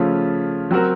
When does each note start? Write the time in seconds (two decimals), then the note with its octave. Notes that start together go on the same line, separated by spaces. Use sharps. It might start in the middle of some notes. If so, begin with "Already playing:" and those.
Already playing: C#3 F3 A3 C#4 F4
0.71 F#3 C4 F#4 A#4